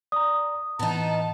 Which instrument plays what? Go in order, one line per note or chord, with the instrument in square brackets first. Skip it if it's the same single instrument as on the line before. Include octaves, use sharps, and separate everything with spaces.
[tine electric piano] D5 A#5 [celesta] D#6
[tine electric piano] A2 E3 [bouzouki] B3 D#4 [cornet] A5